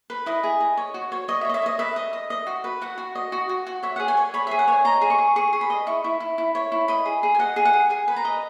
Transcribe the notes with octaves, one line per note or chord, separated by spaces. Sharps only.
B4
E4 D#5
G#4
D#5
C#5
F#4
C#5
C#5 D#5
E5
C#5 D#5
E5
C#5 D#5
B4 E5
D#5
D#5
D#5
F#4
B4
F#4 F#5
F#4
D#5
F#4
F#4
F#4
C#5 E5
G#4 F#5
G#5
C#5
C#5 B5
E5
G#4
F#5
C#5 G#5
D#5 A#5
G#4
C#6
G#4
G#4 C#6
G#4
B5
D#5
E4 C#6
E4
E4
E4
C#5
E4
D#5 B5
G#4
G#4
G#5
D#5 F#5
G#4
F#5
G#4
G#4 G#5
B4
A#5
D#5